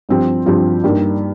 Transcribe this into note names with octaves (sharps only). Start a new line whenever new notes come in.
G2 F3 C4 G4
G2 F3 C4 G4
G2 G3 A#3 D#4